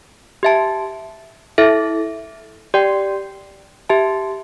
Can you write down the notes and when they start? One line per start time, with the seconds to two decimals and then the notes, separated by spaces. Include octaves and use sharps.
0.43 G4 E5 A5
1.58 E4 A4 E5
2.74 G4 D5 G5
3.89 G4 E5 A5